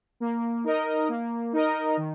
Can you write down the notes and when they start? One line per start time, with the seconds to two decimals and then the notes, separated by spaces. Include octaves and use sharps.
0.20 A#3
0.64 D#4 A#4 D#5
1.09 A#3
1.53 D#4 A#4 D#5
1.97 D#3